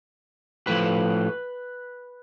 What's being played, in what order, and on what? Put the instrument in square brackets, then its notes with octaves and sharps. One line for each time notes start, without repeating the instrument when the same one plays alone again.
[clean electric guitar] A2 F3 B4